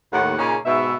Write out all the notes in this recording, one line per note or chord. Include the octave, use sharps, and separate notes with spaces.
D#2 A2 F#5
A#2 C#3 A#3 C#4 D#4 G#4
G#2 B2 E5